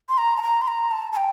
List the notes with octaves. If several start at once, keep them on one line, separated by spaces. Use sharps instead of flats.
C6
A#5
A5
A#5
C6
A#5
A5
A5
G5